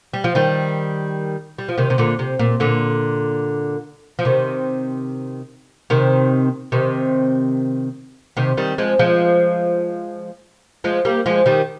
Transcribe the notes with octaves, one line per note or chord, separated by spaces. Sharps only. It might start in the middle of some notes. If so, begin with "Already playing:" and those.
G3
F3
D#3 G3
G3
F3
C3 D#3
C3
A#2 D3
C3
A#2
A#2 D3
F3
C3 D#3
C3 D#3
C3 D#3
C3 D#3
D#3 G3
F3 G#3
F3 G#3
F3 G#3
G3 A#3
F3 G#3
D#3 G3